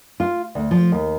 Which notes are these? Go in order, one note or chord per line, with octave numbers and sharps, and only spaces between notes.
F4
D2
F3
D#2